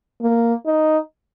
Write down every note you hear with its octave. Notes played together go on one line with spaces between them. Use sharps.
A#3
D#4